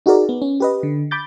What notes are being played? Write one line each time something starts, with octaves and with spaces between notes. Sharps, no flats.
D#4 F#4 G#4 A#4 D5
B3
C#4
G4 B4 D#5
D3
B5 D6 G6 A6